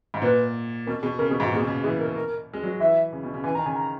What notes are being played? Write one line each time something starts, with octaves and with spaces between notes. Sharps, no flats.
G#2
A#2 B4
B2 A#4
B2 G#4
C#3 A#4
B2 G#4
G#2
F#4
A#2
G#4
B2
C#3
E3 G#4
A#4
A#4
G#3
F#3
E3 E5
C#3
B2
C#3
E3 G#5
D#3 A#5
C#3 G#5
A#5